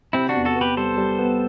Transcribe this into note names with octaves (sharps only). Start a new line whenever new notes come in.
C3 C4 E4
D4 F#4
E2
F#4 A4
B3
G4 B4
G3 A4 C5
G3
B3